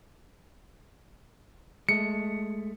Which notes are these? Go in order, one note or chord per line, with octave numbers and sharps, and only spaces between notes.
G#3 A3 C#7